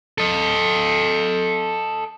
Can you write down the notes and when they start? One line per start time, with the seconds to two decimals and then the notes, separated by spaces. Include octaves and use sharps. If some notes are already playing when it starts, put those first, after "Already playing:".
0.18 A4 D#5